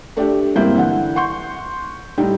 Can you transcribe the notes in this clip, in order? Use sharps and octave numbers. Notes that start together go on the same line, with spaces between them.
A3 D4 G4
C#2 G2 A#3 C4 E4 G6
D3 E3 F#5
F#5 C6 C#6 G6
A2 G3 D#4 G5